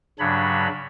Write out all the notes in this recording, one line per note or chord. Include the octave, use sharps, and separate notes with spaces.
G2 C#3 F#3 D4 C#5 B5